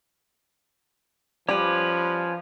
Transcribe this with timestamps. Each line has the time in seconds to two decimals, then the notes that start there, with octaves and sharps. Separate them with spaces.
1.49 F3 G3 C#4 B4